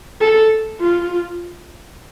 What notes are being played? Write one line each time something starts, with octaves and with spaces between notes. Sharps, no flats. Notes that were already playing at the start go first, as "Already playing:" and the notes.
A4
F4